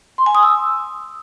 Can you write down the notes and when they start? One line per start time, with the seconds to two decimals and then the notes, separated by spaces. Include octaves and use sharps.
0.18 C6
0.26 G#5
0.35 D#6
0.43 E6